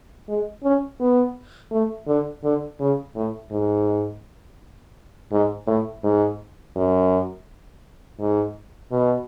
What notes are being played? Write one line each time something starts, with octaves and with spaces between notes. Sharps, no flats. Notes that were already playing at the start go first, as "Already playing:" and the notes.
G#3
C#4
B3
A3
D3
D3
C#3
A2
G#2
G#2
A2
G#2
F#2
G#2
B2